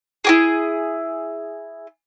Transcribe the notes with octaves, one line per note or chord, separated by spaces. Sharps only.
E4 G4 G#4